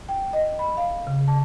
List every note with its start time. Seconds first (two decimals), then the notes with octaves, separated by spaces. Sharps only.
0.09 G5
0.33 D#5
0.59 B5
0.77 F5
1.07 C#3
1.28 A5